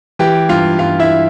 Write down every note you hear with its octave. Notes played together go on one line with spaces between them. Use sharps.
E3 G4 G5
G2 F4 F5
G2 F4 F5
E4 E5